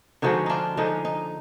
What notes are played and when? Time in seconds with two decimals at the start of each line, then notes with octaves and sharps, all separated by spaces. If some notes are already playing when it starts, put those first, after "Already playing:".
0.22 D3 F3 G#3 D#4 F#4
0.46 D4 D#4 F4
0.77 D3 F3 G#3 D#4
1.05 D#4